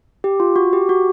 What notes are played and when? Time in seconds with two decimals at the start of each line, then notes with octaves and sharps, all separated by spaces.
0.24 G4
0.40 F4
0.56 F#4
0.73 G4
0.89 F#4